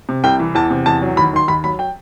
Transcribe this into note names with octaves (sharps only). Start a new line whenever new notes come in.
C3
C2 G5
E3
E2 A5
C3
E2 A5
F#3
D#2 B5
D#3 C6
D#2 B5
F#3 B5
G5